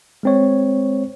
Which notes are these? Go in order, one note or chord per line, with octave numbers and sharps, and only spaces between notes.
G#3 C4 C#5